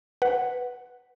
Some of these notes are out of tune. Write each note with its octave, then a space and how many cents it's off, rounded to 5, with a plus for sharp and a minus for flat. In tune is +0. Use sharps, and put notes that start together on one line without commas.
B4 +0 F#5 +0